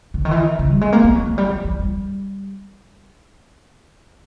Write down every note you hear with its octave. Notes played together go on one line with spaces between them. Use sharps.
D3
D#3
E3
D#3
C#3
G3
G#3
A#3
B3
F#3
F3
G3
F#3
F3
G3